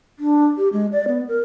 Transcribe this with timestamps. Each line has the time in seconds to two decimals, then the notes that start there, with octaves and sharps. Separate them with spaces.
0.19 D4
0.57 G4
0.73 G#3
0.92 D5
1.08 B3
1.28 A#4